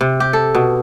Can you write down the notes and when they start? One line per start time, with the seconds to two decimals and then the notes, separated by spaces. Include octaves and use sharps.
0.01 C3
0.20 G4
0.33 A4
0.55 B2